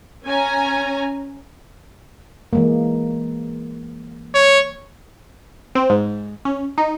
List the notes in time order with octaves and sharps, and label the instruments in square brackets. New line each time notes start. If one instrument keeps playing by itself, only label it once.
[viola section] C#4 G#5 A#5
[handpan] E3 G#3 A#3
[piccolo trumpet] C#5
[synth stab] C4
G#2
C#4
D#4